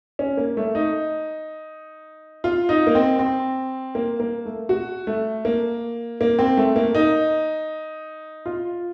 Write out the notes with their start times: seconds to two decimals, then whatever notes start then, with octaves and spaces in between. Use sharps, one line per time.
0.19 C#4
0.37 A#3
0.57 A3
0.75 D#4
2.44 F4
2.69 D#4
2.87 A#3
2.95 C4
3.19 C4
3.95 A#3
4.20 A#3
4.45 A3
4.69 F#4
5.07 A3
5.45 A#3
6.21 A#3
6.39 C4
6.57 A3
6.76 A#3
6.95 D#4
8.46 F4